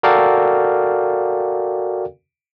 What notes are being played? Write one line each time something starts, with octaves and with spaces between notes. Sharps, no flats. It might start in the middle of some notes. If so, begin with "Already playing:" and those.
F#4 A4 A#4 D5 F5 G5